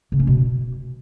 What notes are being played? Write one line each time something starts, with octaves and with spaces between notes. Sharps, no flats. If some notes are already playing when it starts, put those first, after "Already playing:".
C#3
C#4
B2